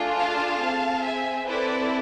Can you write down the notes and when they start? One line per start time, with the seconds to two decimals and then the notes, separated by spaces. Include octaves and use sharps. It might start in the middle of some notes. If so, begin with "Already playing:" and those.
Already playing: A3 D4 F4 G#4
0.19 F5 A5
0.62 C4 G#4
1.04 E5 G#5
1.47 C4 E4 A4 B4 D5